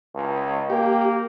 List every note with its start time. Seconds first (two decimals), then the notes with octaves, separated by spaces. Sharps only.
0.15 C#2
0.70 A#3 G4